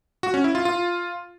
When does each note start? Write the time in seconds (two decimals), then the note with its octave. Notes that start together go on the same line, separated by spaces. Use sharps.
0.23 F#4
0.34 C#4
0.44 E4
0.55 F4
0.65 F4